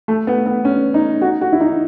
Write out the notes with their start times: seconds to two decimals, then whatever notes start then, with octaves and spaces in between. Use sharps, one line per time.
0.08 A3
0.27 B3
0.46 B3
0.65 C#4
0.94 D#4
1.21 F#4
1.41 F#4
1.52 E4
1.60 D#4